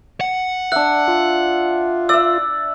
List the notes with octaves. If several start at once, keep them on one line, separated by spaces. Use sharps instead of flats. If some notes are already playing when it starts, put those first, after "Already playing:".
F#5
D4 E5 F#6
F4
D5 E5 E6